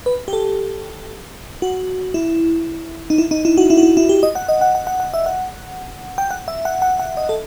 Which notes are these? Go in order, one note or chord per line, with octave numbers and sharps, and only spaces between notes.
B4
G4
A4
F#4
E4
D#4
E4
D#4
E4
F#4
E4
F#4
E4
E4
G4
D#5
F#5
D#5
F#5
F#5
F#5
F#5
E5
F#5
G5
F#5
E5
F#5
F#5
F#5
D#5
A4